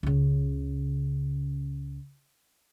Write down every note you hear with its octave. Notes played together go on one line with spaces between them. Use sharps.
C#2 C#3